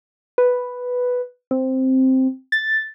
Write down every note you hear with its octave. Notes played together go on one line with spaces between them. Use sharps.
B4
C4
A6